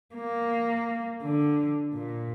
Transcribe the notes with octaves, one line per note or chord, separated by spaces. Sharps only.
A#3
D3
A#2